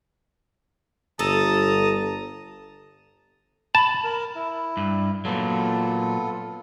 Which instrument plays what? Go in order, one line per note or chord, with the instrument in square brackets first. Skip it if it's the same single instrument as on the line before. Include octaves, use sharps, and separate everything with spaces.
[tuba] G1 [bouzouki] A4 [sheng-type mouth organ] A5 A#5 D#6
[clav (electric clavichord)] A5 [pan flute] B5
[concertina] A#4
E4
[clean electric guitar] G2
[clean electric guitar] A#2 F#3 [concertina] B3 F4 A4